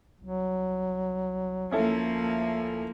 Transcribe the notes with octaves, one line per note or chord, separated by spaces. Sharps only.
C2 F#3
D2 F3 A#3 C#4 E4 A4